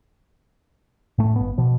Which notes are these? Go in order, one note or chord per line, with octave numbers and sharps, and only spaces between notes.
A2 A3
G1 B3
B2 F3